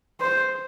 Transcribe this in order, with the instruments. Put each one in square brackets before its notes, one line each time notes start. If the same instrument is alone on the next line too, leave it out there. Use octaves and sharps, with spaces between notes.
[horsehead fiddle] C5